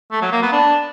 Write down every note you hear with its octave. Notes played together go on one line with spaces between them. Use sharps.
A3
F#3
A#3
B3
D4